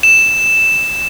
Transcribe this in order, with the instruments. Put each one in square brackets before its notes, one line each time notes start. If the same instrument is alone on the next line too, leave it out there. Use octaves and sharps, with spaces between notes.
[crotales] E7